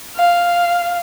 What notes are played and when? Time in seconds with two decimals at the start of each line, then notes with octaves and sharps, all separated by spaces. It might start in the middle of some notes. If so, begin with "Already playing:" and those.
0.17 F5